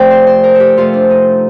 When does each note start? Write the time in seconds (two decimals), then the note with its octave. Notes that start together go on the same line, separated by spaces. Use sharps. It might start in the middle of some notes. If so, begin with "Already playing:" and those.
Already playing: C3 F3 A3 D5 G5
0.11 C5
0.27 C5
0.44 A#4
0.55 G4 A4
0.77 C3 F3 A3 F4
0.93 D4
1.10 D#4